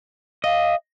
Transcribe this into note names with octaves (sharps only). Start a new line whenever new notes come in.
D#5 F5